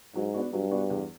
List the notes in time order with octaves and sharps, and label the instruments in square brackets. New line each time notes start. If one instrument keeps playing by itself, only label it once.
[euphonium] G#2 [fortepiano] F#3
[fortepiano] B3 D4 F#4
[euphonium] G2 [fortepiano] F#3
[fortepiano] B3 D4 F#4
E2